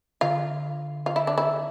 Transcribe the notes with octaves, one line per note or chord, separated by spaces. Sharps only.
D3 F4
F4
E4
D4
E4